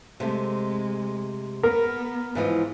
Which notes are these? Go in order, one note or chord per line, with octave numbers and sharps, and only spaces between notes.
C3 G#3 A3
B3 A#4
G#2 E3 F3